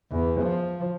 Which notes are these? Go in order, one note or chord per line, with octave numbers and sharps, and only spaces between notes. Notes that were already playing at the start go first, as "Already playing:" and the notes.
E2
F3